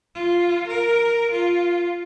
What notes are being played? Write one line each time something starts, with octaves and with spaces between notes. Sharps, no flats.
F4
A#4
F4